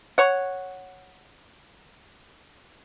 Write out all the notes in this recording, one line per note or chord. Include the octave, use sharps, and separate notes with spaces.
C#5 F#5